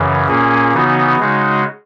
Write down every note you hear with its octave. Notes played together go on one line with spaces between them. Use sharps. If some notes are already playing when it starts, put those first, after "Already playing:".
Already playing: F#2 C#3 E3
A#2 A#3 C#4 G#4
C#3 E3 B3 D#4 F#4
C#3 G#3 D#4 F#4